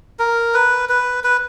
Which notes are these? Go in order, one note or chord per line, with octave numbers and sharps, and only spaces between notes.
A#4
B4
B4
B4